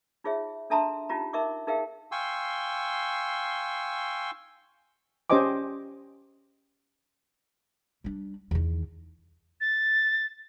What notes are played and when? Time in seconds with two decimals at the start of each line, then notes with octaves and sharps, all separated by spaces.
0.24 D#4 F4 G#4 C#5 E5
0.70 D4 A4 E5 A5 A#5 C6
1.09 C#4 D#4 F4 G4 A#5
1.33 D#4 A#4 D#5 E5 C#6 D6
1.67 D#4 G#4 A#4 E5 F5 G5
2.12 F5 G5 G#5 C6 C#6 E6
5.30 C#4 G4 C5 D#5 G#5 D6
8.04 G3 D4
8.51 E2 D#3
9.61 A6